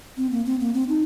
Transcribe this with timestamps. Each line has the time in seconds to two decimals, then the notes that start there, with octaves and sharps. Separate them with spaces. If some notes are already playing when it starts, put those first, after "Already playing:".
0.17 C4
0.31 A#3
0.46 C4
0.60 A#3
0.74 C4
0.89 D#4